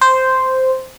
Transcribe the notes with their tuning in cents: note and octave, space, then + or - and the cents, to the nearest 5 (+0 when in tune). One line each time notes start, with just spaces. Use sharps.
C5 -5